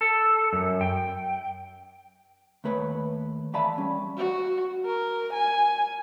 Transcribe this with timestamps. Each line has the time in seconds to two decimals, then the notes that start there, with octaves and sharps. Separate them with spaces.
0.01 A4
0.53 F#2
0.81 G5
2.64 D#2 A3 B4 C#5
3.54 E3 D5 E5 F5 A5 B5
3.78 G3 C#4
4.18 F#4
4.86 A#4
5.34 G#5